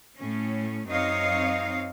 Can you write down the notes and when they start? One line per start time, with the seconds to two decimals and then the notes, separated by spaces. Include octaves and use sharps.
0.18 A2 C#4
0.88 F#2 C4 D#4 C#5 D#5 F5